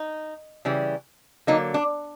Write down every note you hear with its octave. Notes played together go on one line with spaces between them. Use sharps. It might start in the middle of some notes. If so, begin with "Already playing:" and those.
Already playing: D#4
C#3 E3 G3
D3 F#3 A#3 D#4
D4